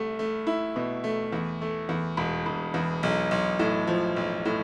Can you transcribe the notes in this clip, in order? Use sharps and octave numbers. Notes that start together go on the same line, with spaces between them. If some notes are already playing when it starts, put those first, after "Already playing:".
Already playing: C2 A3
A3
E4
B2
A3
E2
A3
E2
E1
E1
E2
B1
B1
A2
F3
B1
A2